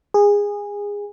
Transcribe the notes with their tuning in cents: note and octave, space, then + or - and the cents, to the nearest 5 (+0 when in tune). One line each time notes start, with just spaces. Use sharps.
G#4 -20